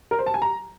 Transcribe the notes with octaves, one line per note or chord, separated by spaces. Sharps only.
A#4
C5
A5
G#5
A#5